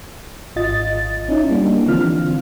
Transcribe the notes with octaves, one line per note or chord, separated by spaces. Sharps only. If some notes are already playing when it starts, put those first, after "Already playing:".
G#1 F4 D#5 A6
C#4 D#4 E4
G3 A#3 D4
D3 E3 F3 C4 F4 F6